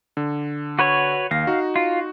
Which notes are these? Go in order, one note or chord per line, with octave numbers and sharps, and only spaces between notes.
D3
F#4 B4 C#5
D#2 F5 A#6
D#4 F#4
F4